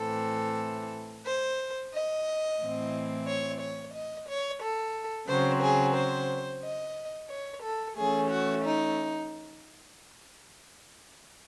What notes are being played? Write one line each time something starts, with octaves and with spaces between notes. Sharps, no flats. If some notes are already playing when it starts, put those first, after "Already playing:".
Already playing: A2 E3 C4 A4
C5
D#5
A2 E3 C4
C#5
C#5
D#5
C#5
A4
C#3 F#3 C4 C5
G#4
C5
D#5
C#5
A4
E3 A3 C#4 G#4
F#4
D#4